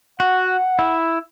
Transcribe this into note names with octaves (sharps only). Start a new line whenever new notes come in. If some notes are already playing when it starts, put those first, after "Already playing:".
F#4 F#5
E4